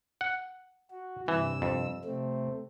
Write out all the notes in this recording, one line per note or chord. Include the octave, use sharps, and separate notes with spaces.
F#5
F#4
G2 C3 E3 E6
F2
C3 A3 C4